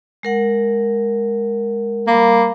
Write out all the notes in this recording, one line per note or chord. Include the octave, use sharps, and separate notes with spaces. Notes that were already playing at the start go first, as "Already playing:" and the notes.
G#3 A#4 F#5
G3 A#3 B5 D6